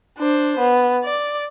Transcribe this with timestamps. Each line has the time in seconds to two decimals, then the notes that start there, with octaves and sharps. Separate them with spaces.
0.19 D4 C5
0.59 B3
1.04 D5